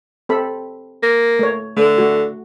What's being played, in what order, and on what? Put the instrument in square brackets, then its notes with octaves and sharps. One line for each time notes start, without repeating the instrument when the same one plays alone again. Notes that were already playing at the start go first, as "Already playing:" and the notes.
[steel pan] C4 A4 B5
[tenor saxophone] A#3
[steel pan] A3 C#5
[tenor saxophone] D3 [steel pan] A3
[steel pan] A3 F#4